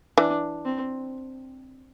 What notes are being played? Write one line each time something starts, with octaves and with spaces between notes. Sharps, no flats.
E3 D4
C4